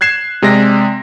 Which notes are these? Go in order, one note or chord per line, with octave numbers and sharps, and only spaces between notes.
F#6 G#6 C7 E7
C3 G#3 D5 A#6